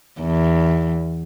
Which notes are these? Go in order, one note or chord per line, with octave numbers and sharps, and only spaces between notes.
E2